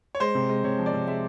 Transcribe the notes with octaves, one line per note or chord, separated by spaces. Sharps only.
C#5
G#3 C5
C3
G#3
C3 C#5
F3
D5
C3
G#3 E5